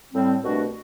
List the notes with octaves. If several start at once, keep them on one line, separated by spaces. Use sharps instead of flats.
A2 G3 C4
C2 B2 A3 D4 F#4